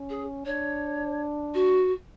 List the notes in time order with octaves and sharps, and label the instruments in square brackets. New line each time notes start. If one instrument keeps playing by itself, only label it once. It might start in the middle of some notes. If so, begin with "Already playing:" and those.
Already playing: [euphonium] C#4
[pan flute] G#4
[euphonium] D4 [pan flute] C#5
[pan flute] F#4